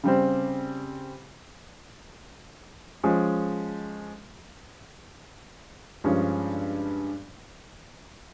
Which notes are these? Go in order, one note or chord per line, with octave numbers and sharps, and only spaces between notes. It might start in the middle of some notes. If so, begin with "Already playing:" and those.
C#3 G3 C4
F3 G#3 C#4
G2 F3 G#3 C#4